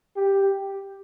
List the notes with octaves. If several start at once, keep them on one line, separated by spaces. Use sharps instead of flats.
G4